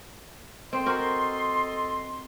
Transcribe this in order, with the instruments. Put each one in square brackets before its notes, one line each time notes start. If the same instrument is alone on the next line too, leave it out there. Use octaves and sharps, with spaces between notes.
[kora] C4 [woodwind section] A4 D#5 C6
[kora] F#4 A#4 C5